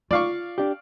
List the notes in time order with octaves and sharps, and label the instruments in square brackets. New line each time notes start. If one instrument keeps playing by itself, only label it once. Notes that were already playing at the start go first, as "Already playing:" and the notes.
[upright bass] F4 [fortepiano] D5 F5 C#6
[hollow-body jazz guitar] D4 G4